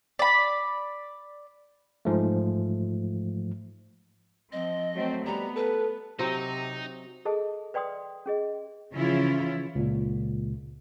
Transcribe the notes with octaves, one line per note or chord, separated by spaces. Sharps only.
D5 B5
G#2 F3 A3
F3 C4 D#5
F#3 A3 C4
G3 B3 A#5
A4 B4
C3 F#3 C4 D#4
G#4 A4 D#5 A5
B4 D5 G5 C6 D#6
C#4 G#4 D#5
C#3 E3 F3 C#4 E4 F4
C#2 A#2